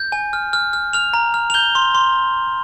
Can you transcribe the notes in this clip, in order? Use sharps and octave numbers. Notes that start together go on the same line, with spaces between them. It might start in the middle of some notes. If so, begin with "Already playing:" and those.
Already playing: G6
G#5
F6
F6
F6
F6 F7
A#5
F6
F7
G6 G7
C6
C6